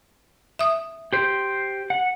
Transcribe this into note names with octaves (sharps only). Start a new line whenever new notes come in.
E5 D#6
G4 C5
F#5